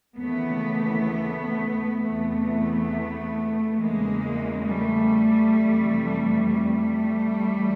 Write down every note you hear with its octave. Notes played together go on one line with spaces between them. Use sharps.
D#2 C#3 E3 A3 B3
E2 C3 E3 A3 B3
E2 C#3 E3 G#3 A#3
G3 A3
F2 C3 E3
G3 A3
D2 C#3 E3